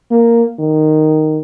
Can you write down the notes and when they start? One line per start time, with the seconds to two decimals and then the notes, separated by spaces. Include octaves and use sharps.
0.11 A#3
0.59 D#3